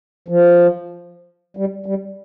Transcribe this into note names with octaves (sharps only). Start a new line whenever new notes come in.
F3
G3
G3